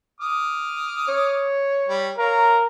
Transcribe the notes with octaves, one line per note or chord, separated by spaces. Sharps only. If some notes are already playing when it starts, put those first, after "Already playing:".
D6 D#6 F6
C#5
G3 G4
A#4 C#5 F5 A#5